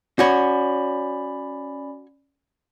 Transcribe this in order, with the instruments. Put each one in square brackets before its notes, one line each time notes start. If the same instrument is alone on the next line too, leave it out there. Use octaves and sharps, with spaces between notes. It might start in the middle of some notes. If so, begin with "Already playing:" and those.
[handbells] C#4 D5 B5 [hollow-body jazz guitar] F#4 C#5